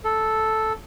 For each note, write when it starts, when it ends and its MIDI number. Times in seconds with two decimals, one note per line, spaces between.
0.04 0.73 69